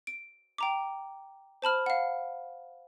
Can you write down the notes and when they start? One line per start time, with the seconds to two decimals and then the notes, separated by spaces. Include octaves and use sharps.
0.07 D7
0.58 G5 A#5 D6
1.62 C5 A5 B5 F6
1.86 F5 F#5